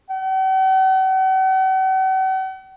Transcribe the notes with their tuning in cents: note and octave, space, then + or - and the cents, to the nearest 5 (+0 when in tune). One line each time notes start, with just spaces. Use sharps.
F#5 +45